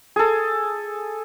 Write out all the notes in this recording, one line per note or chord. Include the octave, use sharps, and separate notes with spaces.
G#4 A4